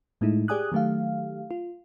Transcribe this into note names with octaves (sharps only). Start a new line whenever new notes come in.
A2 G#3 A3 D#4 E4
G4 G#4 D5 G#5 D#6 F#6
D#3 F#3 A3 G4 F5
F4